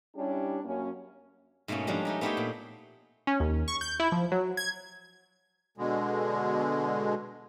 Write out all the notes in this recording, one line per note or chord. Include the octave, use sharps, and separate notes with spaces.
G3 C#4 D4 E4 G4
F#2 A#3 C#4
G#2 B2 A3 A#3 C#4
F3 G3 G#3 A#3 C#4 D4
A3 D#4 A#4
A3 B3 D#4 G4 C5 C#5
A#2
C#4
D#2
C#6
G6
E4
F3
F#3
G#6
B2 D3 G#3